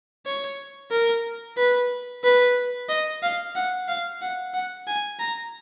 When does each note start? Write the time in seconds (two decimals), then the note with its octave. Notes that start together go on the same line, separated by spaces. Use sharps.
0.26 C#5
0.92 A#4
1.58 B4
2.24 B4
2.89 D#5
3.22 F5
3.55 F#5
3.88 F5
4.22 F#5
4.54 F#5
4.87 G#5
5.20 A#5